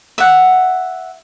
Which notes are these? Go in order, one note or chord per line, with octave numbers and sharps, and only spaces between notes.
E5 F#5